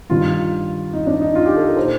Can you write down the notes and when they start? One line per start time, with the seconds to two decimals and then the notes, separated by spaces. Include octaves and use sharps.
0.10 G2 D#3 F4
0.93 D#4
1.07 D4
1.21 D#4
1.35 F4
1.46 G4
1.56 A4
1.67 A#4
1.77 A#2 C5